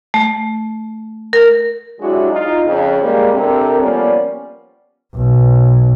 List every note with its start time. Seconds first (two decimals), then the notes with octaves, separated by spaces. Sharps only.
0.14 A3
1.33 A#4
2.00 F#3 G#3 D4 E4 F#4 G4
2.31 D#4 F4 D#5
2.66 F2 C#3 F3
3.03 G3 G#3 A#3
3.33 C3 C4 D4 A4 A#4
3.80 F3 G3 A#3 B3 C#4 D5
5.16 B1